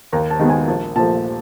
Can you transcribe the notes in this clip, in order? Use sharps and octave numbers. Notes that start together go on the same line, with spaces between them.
D#2 A#5
A5
D#3 G#3 B3
G#5
A#1 A5
A#2 F3 A3 A5